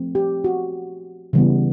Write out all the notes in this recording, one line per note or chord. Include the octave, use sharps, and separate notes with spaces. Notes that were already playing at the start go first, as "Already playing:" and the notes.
Already playing: F3 A3 C4
G4
F#4
C#3 E3 G3 B3